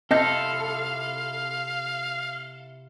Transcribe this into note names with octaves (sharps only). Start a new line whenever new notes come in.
C3 C4 E4 F4 A4 D#5 F5 G6